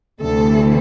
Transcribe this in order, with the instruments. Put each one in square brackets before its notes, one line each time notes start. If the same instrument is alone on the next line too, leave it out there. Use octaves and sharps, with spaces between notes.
[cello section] D2 C3 E3 A4